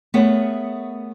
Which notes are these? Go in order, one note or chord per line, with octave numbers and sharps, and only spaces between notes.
A3 B3 G#4 A#4 C#5 F#5